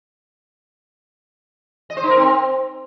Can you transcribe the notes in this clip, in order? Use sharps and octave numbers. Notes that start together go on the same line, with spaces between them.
D#5
C5
D#4
A#4
C4